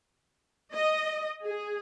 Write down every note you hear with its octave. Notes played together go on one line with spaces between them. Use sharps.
D#5
G#4